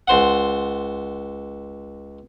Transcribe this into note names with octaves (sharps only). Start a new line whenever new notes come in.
C#2 C5 F#5